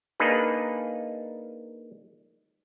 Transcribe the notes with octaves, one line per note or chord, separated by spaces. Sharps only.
A#3 D4 D#4 G#4 B4